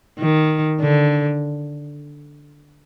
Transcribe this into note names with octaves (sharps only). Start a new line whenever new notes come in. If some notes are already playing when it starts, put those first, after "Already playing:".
D#3
D3